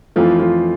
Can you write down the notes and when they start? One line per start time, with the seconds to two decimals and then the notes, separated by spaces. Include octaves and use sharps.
0.16 F2 E3 F3 A3 F4
0.39 F3 F4